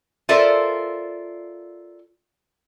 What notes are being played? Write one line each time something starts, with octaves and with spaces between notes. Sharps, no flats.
F4 A4 A#4 C5 D5 E5